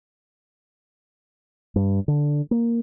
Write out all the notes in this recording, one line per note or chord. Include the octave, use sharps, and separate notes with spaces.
G2
D3
A#3